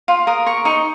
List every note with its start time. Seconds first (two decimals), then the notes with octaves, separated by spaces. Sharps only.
0.08 F4
0.27 A#4 D#6
0.46 A#4 C#6
0.65 D#4 C#6